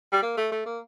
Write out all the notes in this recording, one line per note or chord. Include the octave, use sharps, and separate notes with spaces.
G3
A#3
A3
A3
A#3